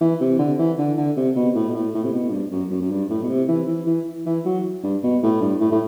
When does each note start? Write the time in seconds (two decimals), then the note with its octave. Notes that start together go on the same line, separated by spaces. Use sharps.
0.01 E3
0.21 C3
0.39 D3
0.59 E3
0.78 D3
0.97 D3
1.17 C3
1.36 B2
1.55 A2
1.69 B2
1.74 A2
1.94 A2
2.04 C3
2.13 B2
2.28 A2
2.32 G2
2.52 F#2
2.70 F#2
2.81 F#2
2.90 G2
3.10 A2
3.23 B2
3.28 C3
3.48 E3
3.67 E3
3.86 E3
4.26 E3
4.45 F#3
4.83 G2
5.03 B2
5.23 A2
5.41 G2
5.61 A2
5.72 A2